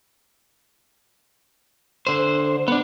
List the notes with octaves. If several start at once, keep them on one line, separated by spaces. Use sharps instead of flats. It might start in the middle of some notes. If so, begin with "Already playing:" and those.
D3 C5
B3 D4